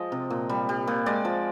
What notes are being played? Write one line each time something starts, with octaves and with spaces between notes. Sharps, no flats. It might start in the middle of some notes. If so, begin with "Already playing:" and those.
Already playing: F3 G#3 D#5
C3
A#2
G3
G3
A#2
G#3 D5
F3